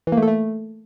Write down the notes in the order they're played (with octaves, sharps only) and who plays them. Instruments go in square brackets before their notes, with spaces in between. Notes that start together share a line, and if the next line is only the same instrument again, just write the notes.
[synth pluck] E3
A#3
A3
A4
A3